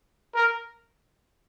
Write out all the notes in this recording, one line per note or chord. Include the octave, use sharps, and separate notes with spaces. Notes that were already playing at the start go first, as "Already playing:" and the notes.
A#4